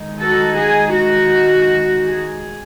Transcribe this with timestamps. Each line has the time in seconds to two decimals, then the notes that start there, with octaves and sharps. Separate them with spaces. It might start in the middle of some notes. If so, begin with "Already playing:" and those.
Already playing: D#3 G#3 D#4
0.20 F#4 A4
0.59 G#4
0.95 F#4
2.07 G#4